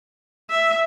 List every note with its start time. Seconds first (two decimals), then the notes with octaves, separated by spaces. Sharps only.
0.50 E5